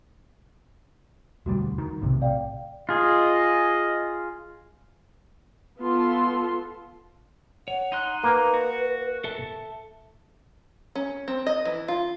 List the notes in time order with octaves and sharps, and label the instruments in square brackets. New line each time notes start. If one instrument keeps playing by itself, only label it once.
[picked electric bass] E1 D2 G3 [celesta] F#4
[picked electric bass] D#3
B1 A2 C3
[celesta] D5 F5 G5
[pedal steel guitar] F4 G#4 [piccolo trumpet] D#5
[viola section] B3 F4 A4 C6
[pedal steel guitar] C#5 [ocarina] F#5
[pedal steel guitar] D#4 C6 F#6
[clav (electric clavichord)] A#3 [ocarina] B4
[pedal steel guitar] F#4
A4 E5 A5
[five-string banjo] C#4
C4
D#5
E3
F4